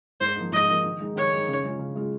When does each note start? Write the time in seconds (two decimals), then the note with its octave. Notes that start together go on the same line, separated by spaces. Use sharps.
0.20 G#2 C5
0.36 F3 A#3 D#4
0.52 G#2 D#5
0.68 F3 A#3 D#4
0.84 D#3
1.00 G#3 D#4
1.16 D#3 C#5
1.32 G#3 D#4
1.48 C#3
1.64 G#3 C#4 F4
1.79 C#3
1.96 G#3 C#4 F4